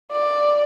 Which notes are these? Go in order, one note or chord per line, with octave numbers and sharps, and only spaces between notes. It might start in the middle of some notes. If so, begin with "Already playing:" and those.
D5